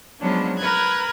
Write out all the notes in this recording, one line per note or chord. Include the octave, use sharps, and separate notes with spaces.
F3 F#3 G#3 B3 C#4 D4
A#4 B4 F#6 G#6